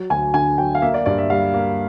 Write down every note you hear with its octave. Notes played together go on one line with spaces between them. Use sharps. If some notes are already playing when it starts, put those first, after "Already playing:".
Already playing: F#3
D2 G#5
D3 G#5
F#3 G5
F5
A#3 E5
D5
G2 D5
E5
G3 F5
A#3